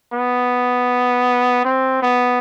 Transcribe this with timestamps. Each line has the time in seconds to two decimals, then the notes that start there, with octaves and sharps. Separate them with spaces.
0.13 B3
1.64 C4
2.02 B3